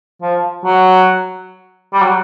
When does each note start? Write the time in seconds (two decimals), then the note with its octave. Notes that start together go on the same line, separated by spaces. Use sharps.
0.22 F3
0.65 F#3
1.93 G3
2.02 F#3